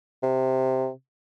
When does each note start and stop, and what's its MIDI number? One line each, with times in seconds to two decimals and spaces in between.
0.23 0.90 48